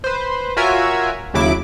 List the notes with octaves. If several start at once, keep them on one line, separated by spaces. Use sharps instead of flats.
B4 C5
F4 F#4 A#4 C#5 E5 G#5
D#2 C#3 F#3 E4 D6 D7